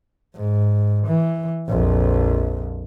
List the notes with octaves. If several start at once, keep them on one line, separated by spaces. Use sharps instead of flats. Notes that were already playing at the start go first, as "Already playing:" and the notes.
G#2
E3
A#1 F2